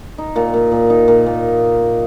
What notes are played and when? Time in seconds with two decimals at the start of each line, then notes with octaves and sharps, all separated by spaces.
0.18 D#4
0.36 A#2
0.54 A#2
0.72 A#2
0.90 D#4
1.08 A#2
1.26 A#2